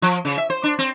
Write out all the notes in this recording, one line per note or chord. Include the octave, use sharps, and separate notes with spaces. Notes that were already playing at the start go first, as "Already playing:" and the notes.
F3
C#3
E5
C5
D4
C4